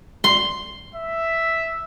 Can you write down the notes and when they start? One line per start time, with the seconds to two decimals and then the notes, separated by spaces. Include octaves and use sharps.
0.24 C6
0.95 E5